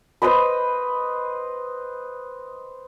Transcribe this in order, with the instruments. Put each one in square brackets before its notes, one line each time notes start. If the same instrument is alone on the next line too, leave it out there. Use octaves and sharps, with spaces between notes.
[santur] B4 C5 D#5 B5